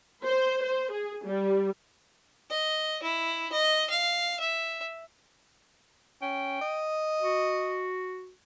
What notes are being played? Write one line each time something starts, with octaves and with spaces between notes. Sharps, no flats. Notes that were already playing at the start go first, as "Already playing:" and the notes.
C5
C5
G#4
G3
D#5
E4
D#5
F5
E5
C#4 G5
D#5
F#4